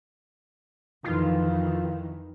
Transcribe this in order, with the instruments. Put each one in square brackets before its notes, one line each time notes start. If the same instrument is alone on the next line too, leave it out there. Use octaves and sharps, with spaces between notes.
[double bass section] F2 D#3 E3 [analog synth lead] F4